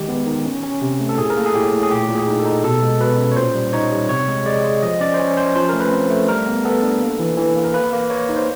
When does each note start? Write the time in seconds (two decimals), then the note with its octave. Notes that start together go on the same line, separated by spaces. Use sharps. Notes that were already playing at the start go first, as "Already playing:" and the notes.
Already playing: D#3 G#3 G4
0.09 B3
0.27 D#3
0.45 C#4
0.63 C#4
0.82 C3
1.00 A3
1.09 A4
1.18 A2 G#4
1.30 A#4
1.37 A#3 A4
1.46 G#4
1.55 A2 G4
1.73 A2
1.83 G#4
1.91 A#2 G4
2.09 A#2
2.15 G#4
2.28 D#4
2.39 A4
2.46 D#4
2.64 B2 A4
2.82 G#3
3.01 B2 B4
3.18 C#4
3.32 C#5
3.36 A#2 C5
3.55 G3
3.73 D#4 C#5
3.92 G3
4.09 C3 C#5
4.28 G#3
4.46 G#3 D5
4.64 G#3
4.83 F3 D#5
5.01 C#4 D5
5.14 C5
5.19 C#4 C#5
5.37 C#4 C5
5.55 F3 C5
5.69 A3 A#4
5.80 B4
5.91 C4
6.10 A3
6.29 G3 A#4
6.46 B3
6.64 B3 A4
6.83 D4
7.01 A#3
7.19 E3
7.38 E3
7.56 A#3
7.64 A#4
7.74 A#3 B4
7.93 A#3
8.10 A#3 C#5
8.29 D#4
8.36 C5